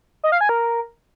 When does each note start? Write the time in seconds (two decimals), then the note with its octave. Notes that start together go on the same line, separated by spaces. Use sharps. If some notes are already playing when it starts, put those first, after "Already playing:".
0.24 D#5
0.32 F5
0.41 G#5
0.49 A#4